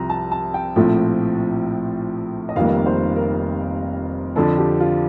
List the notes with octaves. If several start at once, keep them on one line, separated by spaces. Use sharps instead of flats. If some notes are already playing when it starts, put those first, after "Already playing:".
Already playing: C2 C3 F3 A#5
A5
A5
G5
A#1 A2 F3 A3 C4
D#5
F1 F2 D#3 G3 A#3 F5
C5
A#4
F2 D3 F3 A4
G4
F4